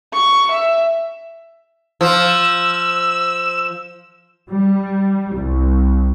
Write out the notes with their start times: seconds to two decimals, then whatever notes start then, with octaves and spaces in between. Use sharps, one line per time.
0.14 C#6
0.51 E5
2.01 F3 E6
4.51 G3
5.36 C2